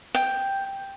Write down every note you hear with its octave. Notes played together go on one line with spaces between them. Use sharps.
G5